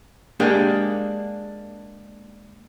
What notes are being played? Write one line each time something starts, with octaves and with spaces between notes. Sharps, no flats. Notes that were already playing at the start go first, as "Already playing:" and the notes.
G#3 A#3 D4 G4 G#4